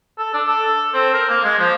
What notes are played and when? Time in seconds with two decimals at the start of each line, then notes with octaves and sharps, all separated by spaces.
0.18 A4
0.34 D4
0.47 A4
0.94 C4
1.14 A#4
1.29 A#3
1.44 G#3
1.59 F3